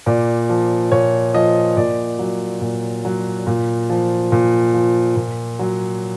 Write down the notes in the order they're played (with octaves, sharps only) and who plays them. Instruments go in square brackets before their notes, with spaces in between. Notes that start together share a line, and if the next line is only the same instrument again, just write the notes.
[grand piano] A#2 D5
F3
A#2 C#5
F3 D#5
A#2 D5
F#3
A#2
F#3
A#2
F3
A#2
F3
A#2
F#3